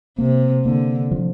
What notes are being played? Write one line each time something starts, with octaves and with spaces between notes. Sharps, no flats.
C3 A#3
D3 A#3
F3